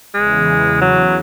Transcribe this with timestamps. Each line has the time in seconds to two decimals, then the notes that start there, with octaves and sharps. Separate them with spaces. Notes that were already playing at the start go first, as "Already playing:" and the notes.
0.14 E2 C#3 E3 G#3
0.81 F#3